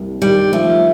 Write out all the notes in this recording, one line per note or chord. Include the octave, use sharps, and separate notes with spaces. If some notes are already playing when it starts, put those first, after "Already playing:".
Already playing: C2 C3 A#3
D#3 G3
F3 A3